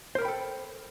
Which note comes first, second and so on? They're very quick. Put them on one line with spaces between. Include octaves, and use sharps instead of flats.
C5 A#4 B5 G5 A4